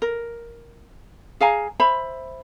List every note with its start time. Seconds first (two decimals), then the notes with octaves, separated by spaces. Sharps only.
0.02 A#4
1.41 G#4 F5 G#5 A#5
1.80 C5 E5 B5